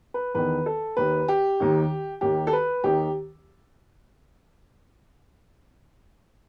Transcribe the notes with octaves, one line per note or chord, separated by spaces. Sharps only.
B4
E2 D#3 B4
A4
D#2 D#3 B4
G4
D#2 D#3
D#2 D#3 G4
A4
B4
D#2 D#3 G4